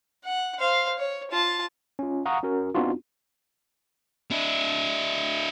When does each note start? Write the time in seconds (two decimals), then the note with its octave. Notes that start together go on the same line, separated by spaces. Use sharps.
0.25 F#5
0.59 C5 F5
0.98 C#5
1.31 F4 A5
1.99 C#4 F4
2.25 F5 F#5 A#5 C#6 D#6
2.43 C#4 F#4 A#4
2.75 B3 C4 D4 D#4 F4 F#4
4.32 D4 E4